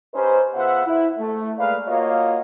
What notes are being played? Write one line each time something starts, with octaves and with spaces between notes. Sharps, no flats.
C#4 D#4 G4 B4 C5
C#3 B3 F4 C5 E5 F#5
E4
A3
G#3 A#3 B4 D5 F5
A#3 F4 F#4 C#5 D#5 F5